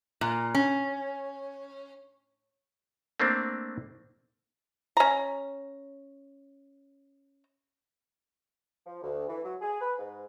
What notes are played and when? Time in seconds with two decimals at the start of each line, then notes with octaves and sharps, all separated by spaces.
0.21 A#2
0.55 C#4
3.20 A3 A#3 C4 D4
4.97 C#4 A#5
8.86 F3
9.02 D2
9.29 E3
9.43 F#3
9.61 G#4
9.80 B4
9.98 G#2